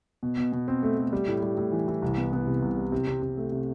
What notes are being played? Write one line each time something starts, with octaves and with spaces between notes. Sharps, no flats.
B2
B2
B2
C4
A3
A3
G3
A2
G3
A2
E3
E3
C2
B3
B3
C3
C2
G3
C3
C3
C3
A3
C3